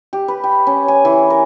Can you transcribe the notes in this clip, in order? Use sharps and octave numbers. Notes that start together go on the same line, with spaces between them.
G4
B4
G5
C#4
G#5
E3
A#4